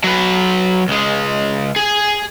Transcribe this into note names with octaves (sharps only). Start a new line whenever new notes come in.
F#3 B4
C#2 G#3
G#4 G#5